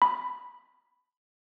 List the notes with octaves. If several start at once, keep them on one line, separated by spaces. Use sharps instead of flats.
B5